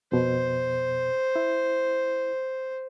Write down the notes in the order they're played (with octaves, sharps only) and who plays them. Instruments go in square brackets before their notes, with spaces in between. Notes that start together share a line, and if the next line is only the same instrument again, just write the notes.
[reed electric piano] F2 B2 [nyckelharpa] C5
[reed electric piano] E4